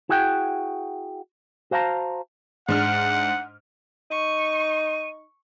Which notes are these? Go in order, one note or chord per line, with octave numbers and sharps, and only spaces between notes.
E4 F#4 G#4 F#5 G5
F#4 C5 F5 A5 A#5
G#2 D4 F#5 F6
D#4 C#6 D#7